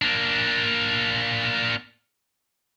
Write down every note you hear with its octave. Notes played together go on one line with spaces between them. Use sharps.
A#3 D4